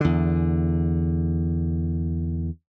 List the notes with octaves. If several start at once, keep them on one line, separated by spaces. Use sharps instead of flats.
E2 D3